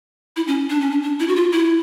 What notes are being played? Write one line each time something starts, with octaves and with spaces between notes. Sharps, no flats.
E4
C#4
D4
C#4
D4
D4
E4
F#4
F4
E4